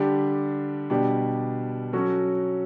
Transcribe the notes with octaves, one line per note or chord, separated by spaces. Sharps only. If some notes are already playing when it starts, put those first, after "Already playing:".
Already playing: D3 G3 D4 G4
B2 G3 D4 G4
F#3 C#4 F#4 A4